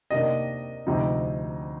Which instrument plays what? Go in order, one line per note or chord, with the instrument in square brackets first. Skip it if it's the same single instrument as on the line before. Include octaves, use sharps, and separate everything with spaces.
[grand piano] C3 D#3 A#3 D4 D#5
D2 C3 F3 C4 D#4